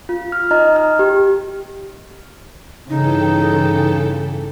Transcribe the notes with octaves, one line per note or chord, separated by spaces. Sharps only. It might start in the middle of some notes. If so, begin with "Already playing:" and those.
F4
F6
D#4 D#5 A#5
F6
G4
G2 C#3 E3 D#4 A4 G5